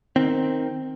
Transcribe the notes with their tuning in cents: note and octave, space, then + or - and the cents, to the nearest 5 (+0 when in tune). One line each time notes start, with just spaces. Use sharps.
D#3 +0 C4 +0